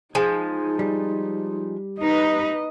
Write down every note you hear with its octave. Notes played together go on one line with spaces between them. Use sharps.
F3 G#3 D#4 G#5
G3
D#4 B4 D#5